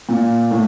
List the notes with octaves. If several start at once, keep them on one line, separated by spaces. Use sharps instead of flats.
A#2
A2